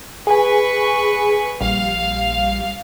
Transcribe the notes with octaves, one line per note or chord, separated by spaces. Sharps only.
G#4 B4 G#5 C#6
A#1 G3 F5